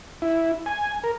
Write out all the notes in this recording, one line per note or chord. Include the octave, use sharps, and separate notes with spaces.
E4
G#5
A#4